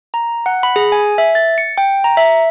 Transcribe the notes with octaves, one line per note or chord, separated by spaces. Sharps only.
A#5
F#5
B5
G#4
G#5
E5
A6
C#7
G5
A#5
E5